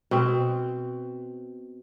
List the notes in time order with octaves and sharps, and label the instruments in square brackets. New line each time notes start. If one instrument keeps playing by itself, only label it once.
[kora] B2 C4